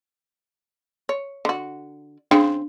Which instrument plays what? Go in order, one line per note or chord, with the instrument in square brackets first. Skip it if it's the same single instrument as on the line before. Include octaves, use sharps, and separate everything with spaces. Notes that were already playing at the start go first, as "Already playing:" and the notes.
[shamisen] C#5
D3 F#4
[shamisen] C#3 C4 G5 [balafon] D4